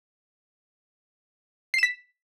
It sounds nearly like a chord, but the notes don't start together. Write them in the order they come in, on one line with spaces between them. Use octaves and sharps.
C7 E7 B6